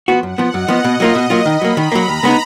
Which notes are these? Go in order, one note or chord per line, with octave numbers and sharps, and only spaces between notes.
F3 B3 F#4
F#2 F#5
F3 B3
F#2 D#5
F3 B3
B2
F#3 A#3 F4
B2
F#3 A#3 F4
D#3 B5
F#3 A#3
D#3 A#5
F#3 A#3
D#2
C#3 G#3 B3 D#4